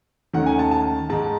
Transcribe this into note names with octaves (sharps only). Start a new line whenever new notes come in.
D#2 D#3 A3 C#4 F#5
G#5
A5
A5
G#2 D#3 G#3 A5